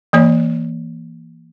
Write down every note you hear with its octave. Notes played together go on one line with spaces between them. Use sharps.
E3 A#3 C#5